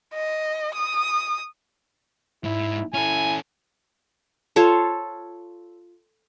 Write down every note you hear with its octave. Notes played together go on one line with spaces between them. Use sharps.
D#5
D#6
G#2 E4
C#4 E4 A4 G#5
F4 A4 C5 C#5